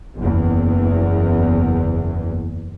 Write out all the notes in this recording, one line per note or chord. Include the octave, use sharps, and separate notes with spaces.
F#1 E2